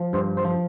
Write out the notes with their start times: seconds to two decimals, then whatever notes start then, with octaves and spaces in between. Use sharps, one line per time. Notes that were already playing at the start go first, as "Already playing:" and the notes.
Already playing: F3
0.13 G2 C5
0.37 C5
0.45 F3